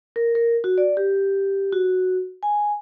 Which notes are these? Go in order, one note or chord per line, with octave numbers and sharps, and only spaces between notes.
A#4
A#4
F#4
D5
G4
F#4
G#5